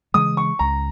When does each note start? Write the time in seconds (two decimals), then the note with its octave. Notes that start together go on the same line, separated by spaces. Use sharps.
0.14 C#3 E3 G#3 D#6
0.37 C#6
0.59 C#2 A#5